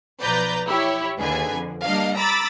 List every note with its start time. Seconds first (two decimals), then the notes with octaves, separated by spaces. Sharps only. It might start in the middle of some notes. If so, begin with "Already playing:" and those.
0.23 B1 F3 B4 D5 A#5 G6
0.67 E4 G4 C#5
1.20 D#2 D3 G#4 B4 G#5
1.52 F2
1.84 G3 A#3 D4 D#5 F5
2.16 A#5 B5 D6 E6 A6